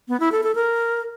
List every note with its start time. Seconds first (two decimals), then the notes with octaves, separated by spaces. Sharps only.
0.08 B3
0.20 E4
0.32 A4
0.43 A4
0.55 A#4